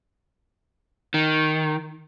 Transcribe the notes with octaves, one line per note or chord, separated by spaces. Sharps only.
D#3